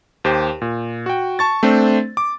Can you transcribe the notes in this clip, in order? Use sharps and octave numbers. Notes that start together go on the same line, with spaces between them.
D#2 G4 C5
A#2
F#4 G5
A5 C#6 A6
A3 C4 D4 C5
D6